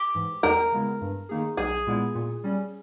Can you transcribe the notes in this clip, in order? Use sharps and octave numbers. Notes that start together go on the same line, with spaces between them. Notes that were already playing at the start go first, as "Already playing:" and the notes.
Already playing: G4
G#2 E3
E2 A#4
C#3 G#3 B3 E4
G2
D#3 A#3 D#4 G#4
B1 G#4
A#2 G#3 B3 E4
A#2
G3 C#4